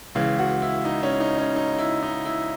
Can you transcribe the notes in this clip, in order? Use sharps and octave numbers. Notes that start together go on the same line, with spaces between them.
C#2 C#3 E3
F#4
E4
D#4
C#4
D#4
C#4
D#4
E4
D#4
E4